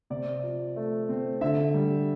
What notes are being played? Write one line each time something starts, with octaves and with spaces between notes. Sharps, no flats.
C3 D5
F3
A3
C4
D3 E5
G3